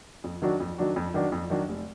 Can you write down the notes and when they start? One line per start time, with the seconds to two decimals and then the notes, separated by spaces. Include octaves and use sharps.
0.24 F2
0.42 D#3 F#3 D4 F#4
0.60 F2
0.78 D#3 F#3 D4 F#4
0.96 F2
1.14 D#3 F#3 D4 F#4
1.32 F2
1.50 D#3 F#3 D4 F#4
1.68 F1